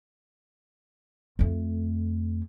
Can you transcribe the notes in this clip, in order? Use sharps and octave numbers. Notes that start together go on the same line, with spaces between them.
F2 A3